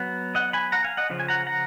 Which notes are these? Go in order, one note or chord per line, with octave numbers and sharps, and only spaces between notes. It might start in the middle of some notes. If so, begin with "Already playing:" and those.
Already playing: F#3 B3
D#5 F#5
G#5 B5
F#5 A#5
F5 G#5
D#5 F#5
C#3 F3
G#5
F#5 A#5
F#5 A#5